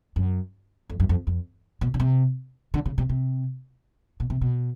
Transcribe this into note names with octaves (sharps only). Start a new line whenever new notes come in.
F#2
F2
F#2
F2
F2
B2
C#3
C3
D3
C#3
C3
C3
B2
C3
B2